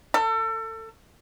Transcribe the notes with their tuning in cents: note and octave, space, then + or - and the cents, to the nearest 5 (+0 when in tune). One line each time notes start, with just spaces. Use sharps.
A4 +30